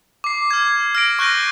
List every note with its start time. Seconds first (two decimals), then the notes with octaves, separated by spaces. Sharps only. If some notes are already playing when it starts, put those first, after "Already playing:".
0.24 D6 C7
0.51 F6 G#6
0.95 F6 A#6 D7
1.19 C#6 F#6 G6 A#6 D#7